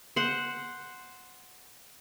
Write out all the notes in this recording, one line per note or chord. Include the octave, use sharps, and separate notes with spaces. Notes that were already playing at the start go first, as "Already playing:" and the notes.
C5 F#5